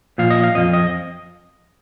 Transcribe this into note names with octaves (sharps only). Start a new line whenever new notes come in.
A#2 F3 F5
D#5
F5
F2 F3 D#5
D#5